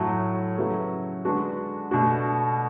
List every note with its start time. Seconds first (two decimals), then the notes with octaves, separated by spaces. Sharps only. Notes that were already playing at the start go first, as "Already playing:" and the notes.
Already playing: A2 F#3 A3
0.58 C#3 F#3 B3 E4 A4
1.25 D3 G#3 B3 D4 F#4
1.91 B2 A3 D4 F#4